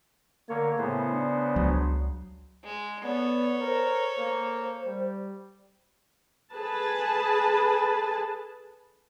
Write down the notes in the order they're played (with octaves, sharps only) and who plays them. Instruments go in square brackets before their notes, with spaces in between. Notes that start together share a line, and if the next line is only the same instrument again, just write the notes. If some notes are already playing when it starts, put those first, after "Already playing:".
[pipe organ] D3 C#5 [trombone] A#3
[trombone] A2 [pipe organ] C#3 B3 C5
[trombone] D4
[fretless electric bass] C#2 F#3
[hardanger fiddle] G#3
[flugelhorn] B3 [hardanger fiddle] A4 C#5 [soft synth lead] D5
[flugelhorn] A#4 [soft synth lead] C5
[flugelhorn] A#3
G3
[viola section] G#4 A4 B4 A5